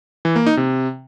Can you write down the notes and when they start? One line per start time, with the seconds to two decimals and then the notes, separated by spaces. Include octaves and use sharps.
0.25 E3
0.36 A#3
0.46 D#4
0.57 C3